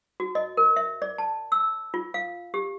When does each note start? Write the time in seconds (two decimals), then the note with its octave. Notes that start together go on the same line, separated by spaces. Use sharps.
0.20 F#4
0.35 D#5
0.57 A#4
0.76 E5
1.02 D5
1.18 A5
1.52 E6
1.94 F4
2.14 F5
2.54 G4